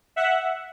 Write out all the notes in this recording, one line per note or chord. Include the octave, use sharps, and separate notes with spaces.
E5 F#5